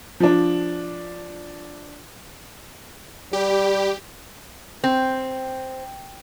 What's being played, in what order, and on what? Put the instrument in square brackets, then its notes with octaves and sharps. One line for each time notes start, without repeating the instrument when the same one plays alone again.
[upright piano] F3 D4
[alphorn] G3 [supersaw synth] G4
[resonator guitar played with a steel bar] C4